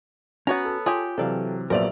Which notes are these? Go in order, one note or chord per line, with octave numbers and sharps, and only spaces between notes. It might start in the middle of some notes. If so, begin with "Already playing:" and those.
B3 C#4 F#4 C#5 A#5
A4
F4 G4 G#4 C#5
C3 E3 F#3 A4 D5 F5
A#1 F#3 B3 A#4 C5 D5 E5 F7